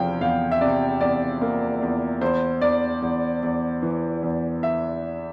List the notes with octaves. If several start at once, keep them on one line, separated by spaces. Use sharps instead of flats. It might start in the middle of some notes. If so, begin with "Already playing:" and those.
Already playing: E2 C3 F3 F5 G5
E2 F5
E5
C3 D5
E2 D5
A#3
E2
E2 C5
E2 D5
E2
E2
E3
E2
E5